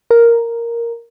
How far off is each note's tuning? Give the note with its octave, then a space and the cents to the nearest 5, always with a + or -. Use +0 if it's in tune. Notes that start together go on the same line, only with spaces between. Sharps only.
A#4 +0